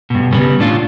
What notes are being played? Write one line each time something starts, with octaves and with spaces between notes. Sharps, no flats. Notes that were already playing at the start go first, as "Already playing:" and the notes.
G2 B2
C#3 G3 B3
A2 D4 F4